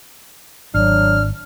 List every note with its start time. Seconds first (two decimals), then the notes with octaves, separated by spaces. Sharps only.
0.74 G#1 F#3 D4 F6